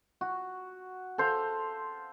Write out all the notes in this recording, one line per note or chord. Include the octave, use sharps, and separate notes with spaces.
F#4
A4 C5 F5